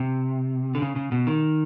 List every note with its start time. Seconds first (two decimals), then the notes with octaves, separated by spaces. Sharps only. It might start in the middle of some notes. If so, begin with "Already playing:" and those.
Already playing: C3
0.75 D3
0.82 C#3
0.96 C#3
1.12 B2
1.27 D#3